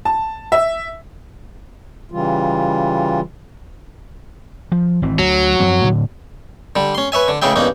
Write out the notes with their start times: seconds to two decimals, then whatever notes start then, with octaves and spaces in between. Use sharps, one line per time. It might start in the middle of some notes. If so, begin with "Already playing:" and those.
0.05 A5
0.52 E5
2.12 C#3 E3 G3 F4
4.72 F3
5.02 G#1 E3 C4
5.19 D2 F#3
5.60 F#2 F3 C4
5.84 A2 D3
6.76 D3 G3
6.95 C#4 C6
7.12 B4 C#5 E5 G#5
7.28 D3
7.42 C#2 A2 C#3 G#4 E5 G5
7.56 E2 G2 A#3 C#4 D#4